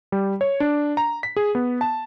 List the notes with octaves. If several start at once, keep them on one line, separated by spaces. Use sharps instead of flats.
G3
C#5
D4
A#5
B6
G#4
B3
A5